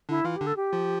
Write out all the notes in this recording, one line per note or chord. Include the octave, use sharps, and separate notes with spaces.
D3 D4 E4
E3 E4 F4
G4
D3 D4
A4
G4
F3 F4